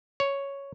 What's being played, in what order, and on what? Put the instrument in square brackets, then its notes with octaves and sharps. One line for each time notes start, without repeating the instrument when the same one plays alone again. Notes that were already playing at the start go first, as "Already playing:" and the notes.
[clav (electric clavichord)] C#5